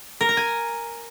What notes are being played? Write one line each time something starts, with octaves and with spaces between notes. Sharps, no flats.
A#4
A#5
G#5